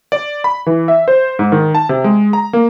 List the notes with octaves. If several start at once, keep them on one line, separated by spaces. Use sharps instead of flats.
D5
B5
E3
E5
C5
G#2
D#3
A5
C3
G#3
A#5
A#3